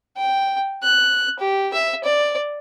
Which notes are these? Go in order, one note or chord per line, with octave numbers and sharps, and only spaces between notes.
G5
F#6
G4
E5
D5